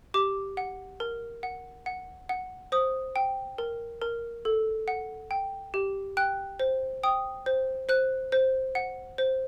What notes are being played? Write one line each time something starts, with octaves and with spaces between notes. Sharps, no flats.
G4 D6
F#5
A#4
F#5
F#5
F#5
C5 D#6
G5
A#4
A#4
A4
F#5
G5
G4
G5 F#6
C5
G5 D#6
C5
C5 F#6
C5
F#5
C5